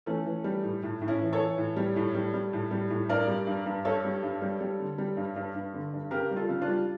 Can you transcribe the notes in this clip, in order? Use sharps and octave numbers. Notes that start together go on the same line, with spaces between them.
E3 A3 C#4
E3
G3
A2
A2
A2
C#4 E4
E3
A4 C#5
E3
A2
G3
A2
G3
G3
A2
G3
A2
G2 A#4 D5
G3
G2
G2
G2 A4 C#5
G3
G2
G3
G3
D3
G3
G2
G2
G2
D3
G2
C#3 G4 A#4
G3
F4 A4
C#3
D4 F4
G3